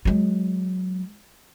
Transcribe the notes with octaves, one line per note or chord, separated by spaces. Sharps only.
F#3 G#3